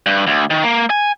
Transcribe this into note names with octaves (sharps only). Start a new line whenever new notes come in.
G2
D2
D#3
A#3
G#5